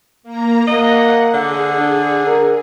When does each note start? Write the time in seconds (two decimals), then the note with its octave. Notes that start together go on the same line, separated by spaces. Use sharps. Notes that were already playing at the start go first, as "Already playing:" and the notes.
0.23 A#3 A#5
0.67 A#3 D#5 F#5
1.33 D3 G#4
1.78 D4
2.27 A#4